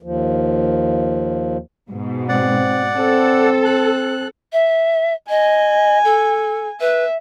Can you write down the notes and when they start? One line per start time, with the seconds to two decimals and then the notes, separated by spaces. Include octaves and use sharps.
0.03 D#2 F3
1.90 G#2 B2
2.29 C4 D5 F#5
2.97 C4 A4
3.65 F#6
4.53 E5
5.29 D#5 G#5
6.04 A4
6.81 B4 E5